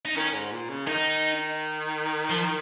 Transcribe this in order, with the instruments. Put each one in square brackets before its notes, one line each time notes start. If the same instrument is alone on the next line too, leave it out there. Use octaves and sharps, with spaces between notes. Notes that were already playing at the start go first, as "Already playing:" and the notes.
[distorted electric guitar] D#4
[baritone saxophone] D#3 [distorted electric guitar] C#4
[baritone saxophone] G#2
A#2
C#3
[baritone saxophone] D#3 [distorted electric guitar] D#4
[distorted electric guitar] F3